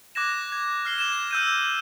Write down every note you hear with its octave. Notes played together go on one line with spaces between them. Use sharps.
D6 F#6 G#6 A#6 E7
G#6
F6 C7 G7
G#6 E7
E6 G6 D#7